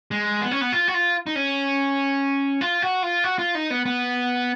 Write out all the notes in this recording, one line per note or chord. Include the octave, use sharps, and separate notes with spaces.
G#3
B3
C#4
B3
F4
F#4
F4
D#4
C#4
F4
F#4
F4
F#4
F4
D#4
B3
B3